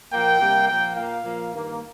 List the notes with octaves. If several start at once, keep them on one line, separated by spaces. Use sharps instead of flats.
A#2 F3 A#3 G5
C3 G3 A#3
A#2 F3 A#3 G5
A#2 A#3 F5
A#2 F3 A#3
G2 D#3 A#3